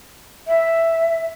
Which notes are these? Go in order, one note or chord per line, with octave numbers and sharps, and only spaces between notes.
E5